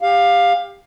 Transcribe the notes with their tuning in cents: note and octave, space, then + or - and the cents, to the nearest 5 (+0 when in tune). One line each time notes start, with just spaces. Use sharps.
G4 +25 F5 +10